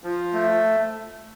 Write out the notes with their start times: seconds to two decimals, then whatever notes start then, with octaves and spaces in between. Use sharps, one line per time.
0.04 F3
0.34 A3